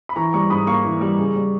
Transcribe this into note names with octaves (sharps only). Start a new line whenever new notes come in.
B5
E3 A#5 C#6
G3 A#5 C#6
G#2 B5 D#6
A#3 A#5 C#6
E3
G3
C#3
G3